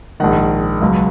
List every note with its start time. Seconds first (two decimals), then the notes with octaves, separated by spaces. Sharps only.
0.20 A#1 G#2 D#3 F#5
0.81 C#2 B2 F#3